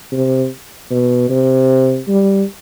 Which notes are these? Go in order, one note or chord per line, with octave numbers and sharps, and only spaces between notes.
C3
B2
C3
G3